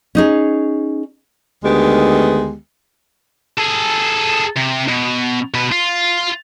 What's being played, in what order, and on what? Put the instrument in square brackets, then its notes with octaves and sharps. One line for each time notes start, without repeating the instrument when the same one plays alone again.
[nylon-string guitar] C#4 D#4 G#4
[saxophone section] D2 D#3 G#3 B3 G4
[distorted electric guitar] G#4 A4
C3
B2
B2 B4
F4